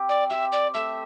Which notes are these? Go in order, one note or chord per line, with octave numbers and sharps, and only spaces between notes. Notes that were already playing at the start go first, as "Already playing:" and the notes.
Already playing: C4 G4
D5
G4 E5
D5
A3 E5